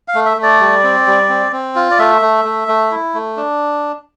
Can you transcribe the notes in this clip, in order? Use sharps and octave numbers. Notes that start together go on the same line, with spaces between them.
F5
A3
E5
A3
D5
G3
C4
G3
C4
C4
F4
D5
A3 E5
A3
A3
A3
E4
A3
D4